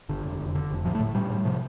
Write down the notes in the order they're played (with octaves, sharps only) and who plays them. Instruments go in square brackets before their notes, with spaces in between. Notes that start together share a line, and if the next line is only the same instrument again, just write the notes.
[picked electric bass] G1 D3
F1
F1
D3
F1
A2 F3
A3
A2
A2 G3
A2
C3 F3